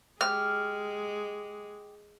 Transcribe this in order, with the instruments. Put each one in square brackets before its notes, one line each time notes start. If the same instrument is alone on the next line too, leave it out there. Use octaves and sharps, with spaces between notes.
[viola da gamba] G#3 [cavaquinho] G4 [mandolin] F6